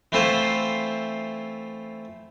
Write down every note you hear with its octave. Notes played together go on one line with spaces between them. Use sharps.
E3 A3 C4 E4 F4 C5